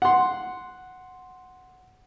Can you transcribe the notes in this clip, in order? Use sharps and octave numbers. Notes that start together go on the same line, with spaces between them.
F#5 C6